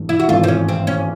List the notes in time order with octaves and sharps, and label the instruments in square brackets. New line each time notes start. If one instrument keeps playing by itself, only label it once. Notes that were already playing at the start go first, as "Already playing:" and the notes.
Already playing: [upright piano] G#1 G2 E3 A3
[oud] E4
F#4
[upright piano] G#1 G2 E3 A3 [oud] F4
[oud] C4
C#4
C4
C#4